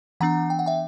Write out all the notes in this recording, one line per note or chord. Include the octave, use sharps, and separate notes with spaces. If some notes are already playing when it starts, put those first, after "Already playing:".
E3 B3 D4 F#5 A#5
G5
F#5
E5 G5